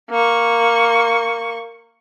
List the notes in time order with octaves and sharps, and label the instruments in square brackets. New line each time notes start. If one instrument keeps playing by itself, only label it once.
[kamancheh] A#3 C#6